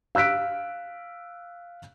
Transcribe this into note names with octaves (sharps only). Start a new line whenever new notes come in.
F5 E6 F#6 B6 D7